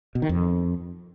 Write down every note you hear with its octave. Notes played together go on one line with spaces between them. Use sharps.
B2
D#3
F2